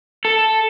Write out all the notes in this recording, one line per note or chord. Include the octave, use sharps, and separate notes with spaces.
A4